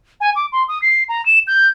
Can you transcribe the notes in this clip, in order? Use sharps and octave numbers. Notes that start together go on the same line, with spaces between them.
G#5
D6
C6
D#6
C7
A#5
E7
G6